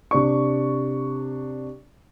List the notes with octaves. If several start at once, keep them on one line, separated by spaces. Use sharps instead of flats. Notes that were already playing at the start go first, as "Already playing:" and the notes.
C3 D4 C#6